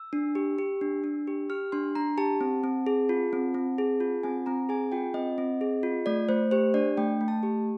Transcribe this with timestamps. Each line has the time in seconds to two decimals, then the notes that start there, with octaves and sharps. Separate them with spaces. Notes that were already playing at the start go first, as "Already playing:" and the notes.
Already playing: E6
0.13 D4
0.35 G4
0.58 G4
0.81 D4
1.04 D4
1.27 G4
1.50 G4 F6
1.72 D4 C6
1.95 D4 A#5
2.18 G4 A5
2.41 C4
2.64 C4
2.87 G#4
3.09 F4
3.33 C4
3.54 C4
3.78 G#4
4.00 F4
4.23 C4 G#5
4.46 C4 A#5
4.69 G#4 G#5
4.92 F4 G5
5.14 C4 D#5
5.38 C4
5.61 G#4
5.83 F4
6.06 A3 D5
6.29 A3 C5
6.51 G4 C5
6.74 D4 D5
6.97 A3 G5
7.21 A3
7.28 A5
7.43 G4